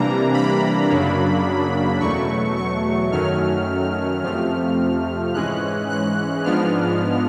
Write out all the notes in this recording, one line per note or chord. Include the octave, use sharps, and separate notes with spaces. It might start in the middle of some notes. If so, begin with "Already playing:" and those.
Already playing: C3 E3 G3 A#3 D4 A#5
B5
F#2 C#3 F#3 A#3 D4
E2 B2 F#3 A3 C#6
C#6
F#2 D#3 F#3 A3 C#4 F6
F2 C3 F3 A3 F6
G#2 E3 G#3 C#4 F#6
F#6
G#2 F3 G#3 B3 D4 F6